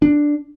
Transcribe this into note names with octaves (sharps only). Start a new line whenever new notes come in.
D4